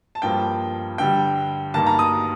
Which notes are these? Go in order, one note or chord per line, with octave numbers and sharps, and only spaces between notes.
A5
G2 F3 A#3 G5
G2 D3 G3 G5
G2 D#3 A#3 A5
A#5
D#6